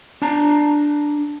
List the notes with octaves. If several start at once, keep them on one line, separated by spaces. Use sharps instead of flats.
D4 A5 A#5